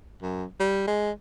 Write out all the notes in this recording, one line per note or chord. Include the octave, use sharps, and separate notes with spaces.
F#2
G3
G#3